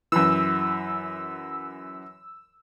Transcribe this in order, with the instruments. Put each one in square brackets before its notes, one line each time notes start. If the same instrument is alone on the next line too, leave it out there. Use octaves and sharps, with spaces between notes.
[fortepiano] F#2 E3 [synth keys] E6